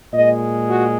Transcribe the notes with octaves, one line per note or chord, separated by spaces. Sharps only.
A#2 G#3 D#5
F#4